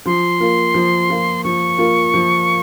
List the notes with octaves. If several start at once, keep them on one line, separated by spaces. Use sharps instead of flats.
F3 C6
A#3 F4
F3
A#3 F4
F3 C#6
A#3 F4
F3